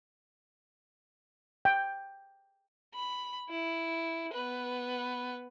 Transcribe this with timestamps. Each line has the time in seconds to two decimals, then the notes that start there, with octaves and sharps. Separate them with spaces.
1.65 G5
2.94 B5
3.50 E4
4.33 B3 B4